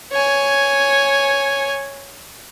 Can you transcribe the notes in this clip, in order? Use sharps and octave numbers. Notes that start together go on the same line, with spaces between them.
C#5 G#5